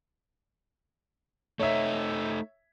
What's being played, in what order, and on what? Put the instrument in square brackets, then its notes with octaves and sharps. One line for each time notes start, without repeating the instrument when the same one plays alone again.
[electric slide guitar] A3 D#4 [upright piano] C#5 E5